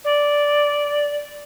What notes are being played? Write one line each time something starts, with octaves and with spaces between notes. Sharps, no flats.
D5